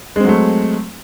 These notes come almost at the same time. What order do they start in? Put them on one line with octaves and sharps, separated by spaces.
G#3 C4 F#3 A3